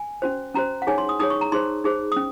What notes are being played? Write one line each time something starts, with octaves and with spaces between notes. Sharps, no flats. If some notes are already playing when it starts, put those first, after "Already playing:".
Already playing: G#5
C#4 F#4 C5
C#4 F#4 C5 A#5
F#5
D#4 G#4 C#5 G#5
C6
D#6
D#4 G#4 C#5 D#6
C#6
A#5
D#4 G#4 C5 C6
D#4 G#4 C5
D#6
C#4